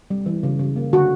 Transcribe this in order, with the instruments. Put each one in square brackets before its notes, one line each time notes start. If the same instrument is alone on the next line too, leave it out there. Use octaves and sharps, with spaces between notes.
[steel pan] G3
E3
C#3
C#3
A#3
D3 F#4